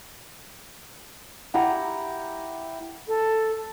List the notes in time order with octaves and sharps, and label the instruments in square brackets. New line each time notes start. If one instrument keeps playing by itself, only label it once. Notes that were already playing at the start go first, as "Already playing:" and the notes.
[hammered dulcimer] E4 G4 F#5 A#5
[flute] A4